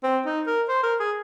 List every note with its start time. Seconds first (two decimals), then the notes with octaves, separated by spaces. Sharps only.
0.04 C4
0.26 D#4
0.47 A#4
0.68 C5
0.83 A#4
1.00 G#4